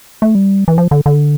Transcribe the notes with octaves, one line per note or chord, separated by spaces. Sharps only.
A3
G3
E3
F3
D3
D3